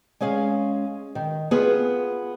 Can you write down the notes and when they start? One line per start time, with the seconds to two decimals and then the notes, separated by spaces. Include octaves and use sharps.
0.21 G#3 C#4 G#4 F5
1.15 D#3
1.51 B3 F4 G#4